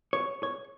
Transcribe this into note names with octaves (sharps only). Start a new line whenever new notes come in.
C#5
C#5